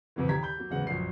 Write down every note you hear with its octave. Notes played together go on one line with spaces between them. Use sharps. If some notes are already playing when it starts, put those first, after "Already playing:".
G1 F2 A#2 D3 E3
D#2 G4 A#5 G#6 B6
B5 G6
F#3 A#3
D1 E2 C#3 G#3 F#5
A#1 F#2 C7